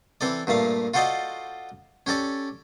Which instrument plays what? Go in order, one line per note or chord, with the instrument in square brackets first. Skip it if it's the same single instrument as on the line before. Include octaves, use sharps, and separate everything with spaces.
[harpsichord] E3 C4 A4 D5
G2 A#2 A3 F5
F4 F#4 A4 C5 D5 D#5
C#4 G4 A4 D5